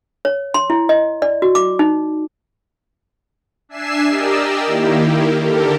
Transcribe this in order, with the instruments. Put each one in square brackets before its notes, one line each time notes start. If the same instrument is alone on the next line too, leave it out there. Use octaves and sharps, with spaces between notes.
[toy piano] C#5
C6
E4
D#5
D5
F#4
D6
D#4
[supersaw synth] D4 E5 G#5 C7 E7
G4 A#4 D5 D#5 E6
D#3 A#3 E4 G4
D3 G4 A4 A#4